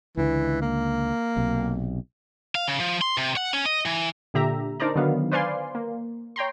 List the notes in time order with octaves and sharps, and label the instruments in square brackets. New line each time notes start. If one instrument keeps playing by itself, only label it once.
[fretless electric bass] C#2 D3 [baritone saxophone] E3
[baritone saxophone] A#3
[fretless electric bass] B1 C3
[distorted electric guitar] F5
C#3
F3
C6
C3
F#5
C#4
D#5
E3
[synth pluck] A#2 D3 G4 E5 A#5
D4 D#4 A#4 C5 D5 A#5
D3 D#3 F#3 B3 F5
B4 C5 D5 F5 G#5 C6
A#3
C#5 G5 A#5 C6